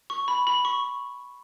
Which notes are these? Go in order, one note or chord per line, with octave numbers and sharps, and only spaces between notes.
C#6
B5
B5
C#6